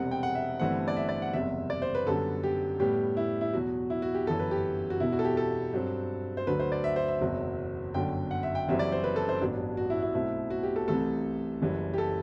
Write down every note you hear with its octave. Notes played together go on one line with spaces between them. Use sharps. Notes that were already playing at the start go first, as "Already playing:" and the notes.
Already playing: E1 E2 C3 G3 C4 F#5
G5
F#5
E5
G1 G2 E3 A3 C4 F#5
D5
E5
D5
F#5
F#1 E2 C3 G3 E5
D5
C5
B4
F#2 D3 G3 B3 A4
G4
A2 G3 B3 G4
E4
E4
E2 B2 F#3 F#4
E4
F#4
G4
G1 F#2 E3 A4
B4
G4
F#4
E1 E2 B2 E4
F#4
A4
G4
A4
G2 F#3 C4
C5
D2 D3 F#3 B4
C5
D5
E5
C5
E5
F#1 E2 B2 F#3 C4
G1 F#2 D3 F#3 G5
F#5
E5
G5
F#1 F#2 E3 G3 C4 E5
D5
C5
B4
A4
C5
A1 G2 F#3 B3 D4
F#4
E4
E4
B1 B2 A3 C4 E4
F#4
G4
A4
C2 C3 E3 A3 A4
F#1 F#2 E3 G3
G4
A4